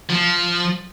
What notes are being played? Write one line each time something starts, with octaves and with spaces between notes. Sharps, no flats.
F3